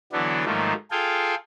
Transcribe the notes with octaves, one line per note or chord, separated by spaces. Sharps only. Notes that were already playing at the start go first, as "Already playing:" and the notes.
D3 E3 F#3 B3 D4
G#2 D#3 F3 F#3 A3 A#3
F4 G#4 A4 F5 G5